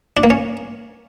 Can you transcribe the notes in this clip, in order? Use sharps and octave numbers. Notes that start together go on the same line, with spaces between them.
D4
A#3
C#4